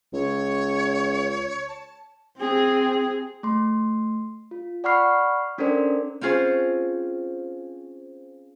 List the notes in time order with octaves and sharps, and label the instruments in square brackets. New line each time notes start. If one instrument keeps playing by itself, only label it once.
[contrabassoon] C#2 [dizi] C#5
[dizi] A5
[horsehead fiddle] C4 G#4
[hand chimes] A3 C6
F4
D5 F#5 B5 C#6 F6 C7
C#4 D4 A4 A#4 C5 D5
[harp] C4 C#4 F4 G#4 C5